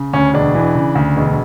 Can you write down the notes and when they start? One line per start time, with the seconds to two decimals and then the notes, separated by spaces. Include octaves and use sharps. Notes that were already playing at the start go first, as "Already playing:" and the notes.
Already playing: C#3
0.13 D2 C#4
0.34 E1 D4
0.55 E3
0.75 C#3
0.95 D2
1.17 E1